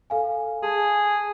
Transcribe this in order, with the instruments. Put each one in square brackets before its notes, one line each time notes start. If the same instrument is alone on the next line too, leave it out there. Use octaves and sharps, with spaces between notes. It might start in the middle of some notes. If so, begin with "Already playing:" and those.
[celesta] A4 F5 G#5
[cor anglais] G#4 [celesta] A5